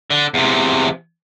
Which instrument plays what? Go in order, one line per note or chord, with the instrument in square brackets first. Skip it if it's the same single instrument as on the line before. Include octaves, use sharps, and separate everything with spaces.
[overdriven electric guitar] D3
E2 C3